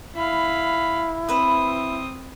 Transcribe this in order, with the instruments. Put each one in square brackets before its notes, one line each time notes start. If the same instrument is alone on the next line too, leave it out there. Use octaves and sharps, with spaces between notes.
[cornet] E4 [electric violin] F5 B5
[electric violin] C4 D#6 [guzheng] B4 E5